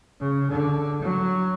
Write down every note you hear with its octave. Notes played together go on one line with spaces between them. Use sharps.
C#3
D3
F#3